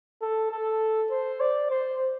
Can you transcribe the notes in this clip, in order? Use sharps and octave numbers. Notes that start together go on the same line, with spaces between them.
A4
A4
C5
D5
C5